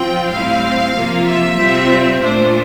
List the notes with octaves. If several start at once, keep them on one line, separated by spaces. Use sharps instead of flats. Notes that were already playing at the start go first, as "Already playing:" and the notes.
Already playing: F3 C4 F4 G5
A2 G3 C4 E4 F5
C3 F3 A#3 F4
E5
C3 G3 C4 F4
A#2 A3 D4 F4 C5